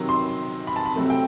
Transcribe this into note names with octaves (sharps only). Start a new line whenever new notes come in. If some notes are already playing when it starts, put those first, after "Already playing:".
Already playing: C3 D#3 F#3 C4
C6
B5
A5
B5
C3 F#3 A3 C4
G5